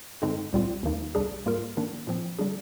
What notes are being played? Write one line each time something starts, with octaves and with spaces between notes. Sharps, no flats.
G2 D3 G#3 C4 D#4
C2 A#2 G3 C4 F4
D#2 D#3 A#3 D#4
C2 C3 G3 D4 G#4
G#2 G3 A#3 F4 A#4
D#3 A#3 D4
A#2 F3 C4
D3 G3 D4 G#4